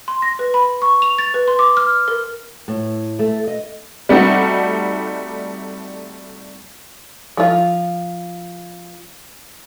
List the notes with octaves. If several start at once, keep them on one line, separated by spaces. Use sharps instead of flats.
C6
A#6
B4
B5
C#6
F7
A6
B4
C6
D6
F6
A#4
A2
A3
D#5
G3 A3 C4 D#4 F#4
F3 F4